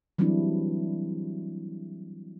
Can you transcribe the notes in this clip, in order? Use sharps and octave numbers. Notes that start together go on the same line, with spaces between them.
E3 F#3 G3 C4 D4 E4